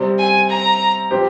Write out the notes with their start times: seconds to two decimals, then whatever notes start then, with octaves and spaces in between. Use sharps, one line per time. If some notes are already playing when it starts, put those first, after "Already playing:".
Already playing: C3 G3 C4
0.19 G#5
0.49 A#5
1.11 F3 C4 G4 C5